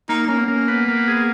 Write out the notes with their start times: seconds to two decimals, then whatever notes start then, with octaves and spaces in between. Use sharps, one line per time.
0.09 A#3 D#4
0.28 A#3 C#4
0.39 B3
0.48 A#3 C#4
0.68 B3 B4
0.88 A#3
1.08 G#4